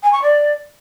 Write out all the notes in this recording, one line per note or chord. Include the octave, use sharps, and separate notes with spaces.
G#5
C#6
D5